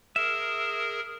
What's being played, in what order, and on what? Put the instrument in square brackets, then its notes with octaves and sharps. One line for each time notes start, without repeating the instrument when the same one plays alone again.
[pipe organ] G#4 A#4 [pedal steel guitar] E5